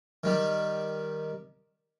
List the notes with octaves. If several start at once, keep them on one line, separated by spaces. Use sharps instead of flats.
D#3 G3